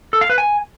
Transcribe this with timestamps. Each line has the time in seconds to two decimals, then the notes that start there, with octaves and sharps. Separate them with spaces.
0.13 A4
0.21 F5
0.30 B4
0.38 G#5